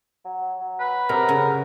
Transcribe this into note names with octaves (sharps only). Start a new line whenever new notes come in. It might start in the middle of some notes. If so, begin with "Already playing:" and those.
F#3
F#3
B4
F#2 C3 A#4
C#3